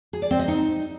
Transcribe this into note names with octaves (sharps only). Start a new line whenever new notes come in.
G#4
D5
C4
D#5
D#4